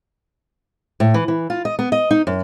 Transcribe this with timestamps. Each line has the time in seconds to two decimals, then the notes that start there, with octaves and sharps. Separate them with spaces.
1.00 A2
1.14 E3
1.28 E3
1.50 F4
1.65 D#5
1.79 B3
1.92 D#5
2.11 D#4
2.27 F#2